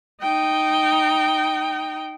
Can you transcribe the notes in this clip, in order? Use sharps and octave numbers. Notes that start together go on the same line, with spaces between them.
D#4 G5